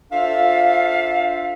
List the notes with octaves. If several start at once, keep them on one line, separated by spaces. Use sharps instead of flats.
D4 F4 A4 C5 E5 F5